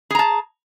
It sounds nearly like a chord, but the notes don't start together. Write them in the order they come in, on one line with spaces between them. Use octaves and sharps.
G#4 A#5 A5